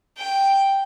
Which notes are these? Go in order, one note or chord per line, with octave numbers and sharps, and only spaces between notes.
G5